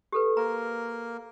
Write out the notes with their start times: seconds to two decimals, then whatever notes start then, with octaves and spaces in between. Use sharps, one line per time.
0.12 G4 A4 B4
0.37 A#3 A#4 A#5